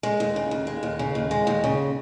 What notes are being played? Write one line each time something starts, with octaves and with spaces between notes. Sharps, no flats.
G#3
D#2
C#3
D#2
G#3
D#2
C#3
D#2
G#3
D#2
C#3